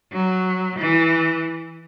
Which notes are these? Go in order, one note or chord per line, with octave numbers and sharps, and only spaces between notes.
F#3
E3